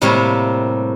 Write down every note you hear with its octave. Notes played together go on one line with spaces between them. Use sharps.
A2 C3 G3 A3 A#3